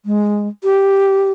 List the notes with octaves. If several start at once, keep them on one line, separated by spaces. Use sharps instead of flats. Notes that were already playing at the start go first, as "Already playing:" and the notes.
G#3
G4